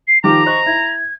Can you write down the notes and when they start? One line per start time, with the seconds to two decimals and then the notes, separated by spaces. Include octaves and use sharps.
0.07 C7
0.24 D#3 F3 G4 A#5 D6
0.46 C5 D#5 C#6 F#6
0.66 E4 G#6